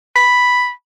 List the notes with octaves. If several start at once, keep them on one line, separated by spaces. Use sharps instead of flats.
B5